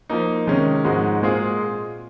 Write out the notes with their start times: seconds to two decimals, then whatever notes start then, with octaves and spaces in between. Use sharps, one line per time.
0.09 F3 A#3 D#4
0.47 C3 D#3 G#3 C#4
0.84 G#2 F3 G#3 D#4 F#4
1.22 A#2 G#3 C4 F4 G#4